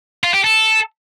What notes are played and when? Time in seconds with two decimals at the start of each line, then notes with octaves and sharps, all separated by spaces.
0.24 F4
0.34 G4
0.44 A4